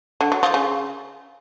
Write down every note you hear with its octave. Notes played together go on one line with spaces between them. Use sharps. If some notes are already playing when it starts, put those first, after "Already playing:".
D3
F#3
F3
C#3